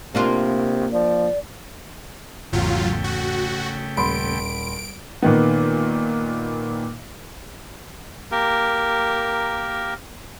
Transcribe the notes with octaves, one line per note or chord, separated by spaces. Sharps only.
C3 A#3 D4 F4
F3 D5
G#1 E2 C#3 F#3 A3 F4 G5
F#4
D#1 B5 C6 D7
A#2 D#3 B3
A#3 G4 A#4